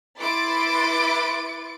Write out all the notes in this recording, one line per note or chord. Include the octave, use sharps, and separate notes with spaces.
E4 B4 C6 D6 A6 D7